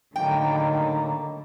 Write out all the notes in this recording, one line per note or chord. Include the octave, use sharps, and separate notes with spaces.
A2 D3 D#3 F#3 A#3 G5